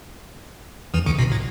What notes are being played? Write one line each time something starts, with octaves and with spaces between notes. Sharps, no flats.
E2 E3
D2 D3
B1 B2
A2